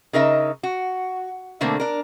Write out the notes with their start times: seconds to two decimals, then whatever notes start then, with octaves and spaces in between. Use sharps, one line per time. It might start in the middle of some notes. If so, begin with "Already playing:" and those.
0.13 C#3 D#4 A#4 D#5 E5
0.63 F#4
1.61 B2 D3 A3 A#3 C4
1.80 D4 A#4